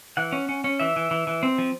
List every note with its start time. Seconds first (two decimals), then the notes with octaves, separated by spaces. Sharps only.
0.17 E3 F#5
0.32 C#4
0.49 C#4
0.64 C#4
0.79 E3 E5
0.96 E3
1.11 E3
1.27 E3
1.43 C4
1.58 F3